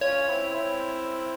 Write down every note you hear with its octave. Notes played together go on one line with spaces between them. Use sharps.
C#4 F4 C#5
C4 E4
C4 E4